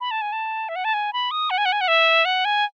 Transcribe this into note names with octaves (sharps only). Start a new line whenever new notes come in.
B5
A5
G#5
A5
E5
F#5
A5
G#5
B5
D#6
F#5
G#5
F#5
G#5
F#5
E5
F#5
G#5